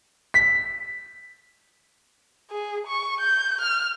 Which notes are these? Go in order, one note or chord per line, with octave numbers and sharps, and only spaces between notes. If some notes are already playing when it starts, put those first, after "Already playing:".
B6
G#4
C#6
G6
F6